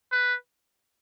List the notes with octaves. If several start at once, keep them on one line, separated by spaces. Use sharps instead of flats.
B4